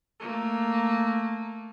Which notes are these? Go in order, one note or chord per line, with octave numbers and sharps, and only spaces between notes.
A3 A#3